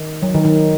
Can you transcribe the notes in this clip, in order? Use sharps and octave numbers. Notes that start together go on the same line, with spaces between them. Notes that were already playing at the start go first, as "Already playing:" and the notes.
Already playing: D#3
F#3
D#3
D#3